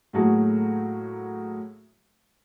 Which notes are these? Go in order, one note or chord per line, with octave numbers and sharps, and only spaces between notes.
A2 F#3 A3 A#3 F#4 G#4